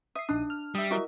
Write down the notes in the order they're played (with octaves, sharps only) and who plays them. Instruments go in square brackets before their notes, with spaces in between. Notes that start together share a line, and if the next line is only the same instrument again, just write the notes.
[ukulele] E5 [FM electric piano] D#6 C7
[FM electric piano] A#1 D#4 D#6 [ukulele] D4
[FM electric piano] F6
[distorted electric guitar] G3 [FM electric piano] E5 D#6
[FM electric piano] E4 A#4 D#5 [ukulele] F#4 E5